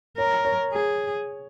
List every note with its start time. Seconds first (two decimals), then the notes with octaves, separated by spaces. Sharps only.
0.18 A#4 C#5
0.45 C#5
0.73 G#4